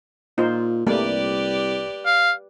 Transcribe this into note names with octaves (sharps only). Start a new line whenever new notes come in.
A#2 D#4 F4 C5
C2 G3 A3 A#3 G4 B4 D5
F5